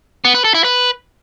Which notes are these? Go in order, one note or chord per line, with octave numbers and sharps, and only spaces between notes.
B3
B4
A4
E4
B4